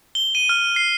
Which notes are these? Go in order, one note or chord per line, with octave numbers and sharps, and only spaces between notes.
G7
D#7
F6
C7